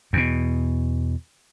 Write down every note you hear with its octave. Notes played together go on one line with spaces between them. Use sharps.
E2 B2